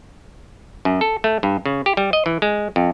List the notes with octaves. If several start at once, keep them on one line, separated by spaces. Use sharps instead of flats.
F#2
A4
A3
G2
C#3
G4
G3
D#5
E3
G#3
F2